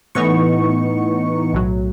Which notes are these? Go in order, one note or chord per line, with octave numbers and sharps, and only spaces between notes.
A2 E3 B3 D#4 C#6
B1 A2 F#3